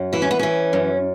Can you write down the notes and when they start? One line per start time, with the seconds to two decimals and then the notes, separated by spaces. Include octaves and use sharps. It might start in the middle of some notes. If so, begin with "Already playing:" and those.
Already playing: F#2
0.13 E3 E4
0.22 C#4
0.31 B3
0.39 E3 C#4
0.73 F#2